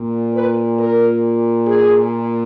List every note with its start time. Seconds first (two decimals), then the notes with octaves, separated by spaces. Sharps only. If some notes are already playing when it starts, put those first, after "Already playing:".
Already playing: A#2
0.34 B4
0.78 A#4
1.67 G#4